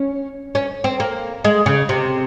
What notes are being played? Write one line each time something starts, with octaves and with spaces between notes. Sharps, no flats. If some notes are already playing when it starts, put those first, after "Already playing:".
Already playing: C#4
C#4
C4
A#3
G#3
C#3
C3